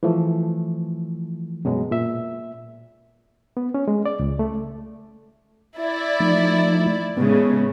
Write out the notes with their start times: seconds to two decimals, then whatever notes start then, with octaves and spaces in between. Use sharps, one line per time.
0.03 E3 F3 A3
1.65 F#2 B2 F#3 G#3
1.91 A#2 E5
3.57 B3
3.74 C#4
3.88 G#3
4.06 D5
4.20 C#2
4.39 A3
5.78 E4 D5
6.20 F3 A3 D#4
7.17 A2 C#3 G#3 B3